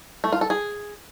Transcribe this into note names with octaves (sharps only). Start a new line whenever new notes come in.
A3
F4
A4
G#4